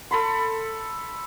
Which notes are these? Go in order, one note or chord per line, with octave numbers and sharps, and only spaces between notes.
A4 B5 C6